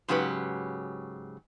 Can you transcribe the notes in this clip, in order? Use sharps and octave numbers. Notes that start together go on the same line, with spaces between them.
G#2 C#3 F#3 G4 B4